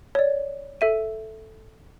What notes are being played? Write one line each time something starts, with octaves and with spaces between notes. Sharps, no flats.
C#5 D5
A4 E5 D#7